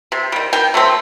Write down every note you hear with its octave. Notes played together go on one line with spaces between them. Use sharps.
C3
D#3 G3
D#3 G5
F#3 A3 C4